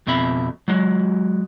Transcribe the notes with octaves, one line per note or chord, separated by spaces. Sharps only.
F2 B2 C4 E5 B5
F#3 G#3 F#4